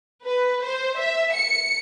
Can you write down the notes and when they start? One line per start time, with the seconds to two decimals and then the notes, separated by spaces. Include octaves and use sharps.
0.24 B4
0.63 C5
0.97 E5
1.33 C#7